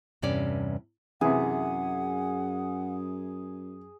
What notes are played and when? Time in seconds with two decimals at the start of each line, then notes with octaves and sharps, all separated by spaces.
0.22 E2 G2 C3 C#4 D5
1.21 F#2 C3 E3 G#4 F#5